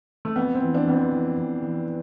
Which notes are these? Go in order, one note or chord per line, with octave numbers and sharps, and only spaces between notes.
A3
F2 B3
C4
E3
D4
F2 B3
C4
E3
F2
E3